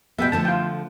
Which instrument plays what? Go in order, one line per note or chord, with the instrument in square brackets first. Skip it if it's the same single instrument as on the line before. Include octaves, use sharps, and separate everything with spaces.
[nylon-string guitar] B2 G#3 B3 [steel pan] E5 G5
[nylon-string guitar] D3 F3 A3 [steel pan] A5
[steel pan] F4 G5